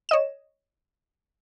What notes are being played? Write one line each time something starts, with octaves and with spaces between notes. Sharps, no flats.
C#5 D#5 E7